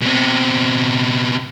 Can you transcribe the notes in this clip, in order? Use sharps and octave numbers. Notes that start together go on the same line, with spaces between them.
B2 C4